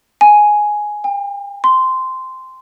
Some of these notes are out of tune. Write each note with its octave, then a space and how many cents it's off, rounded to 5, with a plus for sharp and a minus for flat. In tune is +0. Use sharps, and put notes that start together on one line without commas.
G#5 +5
G5 +40
C6 -10